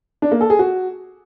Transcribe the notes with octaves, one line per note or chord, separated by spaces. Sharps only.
D4
A#3
A4
G#4
F#4